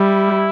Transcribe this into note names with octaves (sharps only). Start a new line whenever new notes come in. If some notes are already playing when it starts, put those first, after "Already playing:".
Already playing: G3 E4